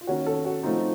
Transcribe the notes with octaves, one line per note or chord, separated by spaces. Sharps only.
F4
D#3 A#3 C#4 F#4
A4
F#4
F3 A3 C4 D#4 F4